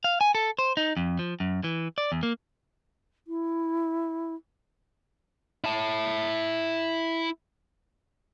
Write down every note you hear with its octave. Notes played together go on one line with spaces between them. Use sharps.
F5
G#5
A4
C5
D#4
F2
F3
F#2
E3
D5
E2
A#3
E4
E4 A5